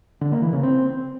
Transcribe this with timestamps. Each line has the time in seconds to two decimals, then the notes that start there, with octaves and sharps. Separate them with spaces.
0.21 D3
0.32 A#3
0.42 E3
0.53 C#3
0.63 C4